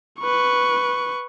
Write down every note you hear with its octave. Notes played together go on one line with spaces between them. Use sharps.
B4 C#6